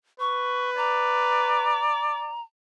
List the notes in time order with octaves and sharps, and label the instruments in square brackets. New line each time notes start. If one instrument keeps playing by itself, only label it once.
[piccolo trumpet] B4 [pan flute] C#6
[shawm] D5 [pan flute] A#5